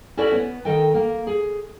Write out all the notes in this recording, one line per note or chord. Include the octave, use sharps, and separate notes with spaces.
C#4 E4 F#4 A4 C#5 D5
B3
D#3 A4 D#5 G5
A#3
G#4